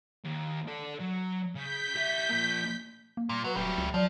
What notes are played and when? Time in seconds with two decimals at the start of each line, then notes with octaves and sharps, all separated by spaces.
0.25 D#2
0.68 A4 D5
1.00 F#3
1.55 C#3 G6 B6
1.94 G3 E5
2.29 F3 A#3
3.17 A#3
3.29 A#2 G3
3.44 F#3 B4
3.56 D#1 F#3 G3 A3
3.78 C#2
3.94 F3 F#3 D5